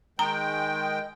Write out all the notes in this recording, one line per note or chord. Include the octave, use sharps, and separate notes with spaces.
D#3 G#3 G5 A#5